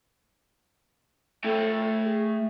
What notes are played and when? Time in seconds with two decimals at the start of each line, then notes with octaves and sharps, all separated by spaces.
1.45 A3 A4 G5
2.05 G#4